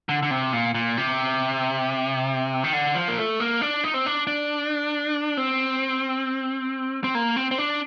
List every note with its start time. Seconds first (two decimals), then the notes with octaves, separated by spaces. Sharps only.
0.09 D3
0.23 D3
0.31 C3
0.53 A#2
0.74 A#2
0.97 C3
2.64 D#3
2.73 D3
2.95 F3
3.08 A#3
3.18 A3
3.40 A#3
3.61 D4
3.84 D#4
3.94 C4
4.06 D4
4.27 D4
5.37 C4
7.04 C4
7.15 A#3
7.36 C4
7.51 C4
7.58 D4